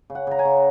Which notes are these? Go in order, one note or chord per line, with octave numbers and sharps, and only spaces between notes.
C#3
F#5
C#3 A#5
G#5
C#3